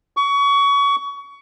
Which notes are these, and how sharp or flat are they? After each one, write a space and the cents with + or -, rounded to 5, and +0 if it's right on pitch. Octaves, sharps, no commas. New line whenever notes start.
C#6 +25